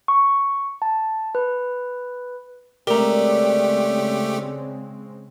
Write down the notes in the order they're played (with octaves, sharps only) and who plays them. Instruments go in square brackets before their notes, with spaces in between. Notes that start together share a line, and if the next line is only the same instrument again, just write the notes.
[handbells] C#6
A5
B4
[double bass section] C#3 G#3 C4 [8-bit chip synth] A3 G4 [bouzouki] D4 [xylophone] A#4 A#5